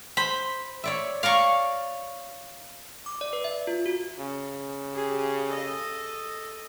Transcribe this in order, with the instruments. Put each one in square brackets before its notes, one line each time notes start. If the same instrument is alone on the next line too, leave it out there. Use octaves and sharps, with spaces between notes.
[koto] C5 [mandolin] B5
[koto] C#5 D5 E5
[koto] C#5 D5 A#5 [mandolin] F5 C#6
[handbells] D6
D5
B4
E5
F4
F#4
[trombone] C#3
[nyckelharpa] G4 G#4
A4 D#5